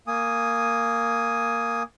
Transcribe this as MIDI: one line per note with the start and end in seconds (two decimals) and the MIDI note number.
0.07 1.83 58
0.07 1.83 80
0.07 1.83 87